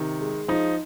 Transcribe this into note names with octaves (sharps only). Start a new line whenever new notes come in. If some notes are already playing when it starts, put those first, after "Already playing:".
Already playing: C3 D#3
G#3
F3 D#4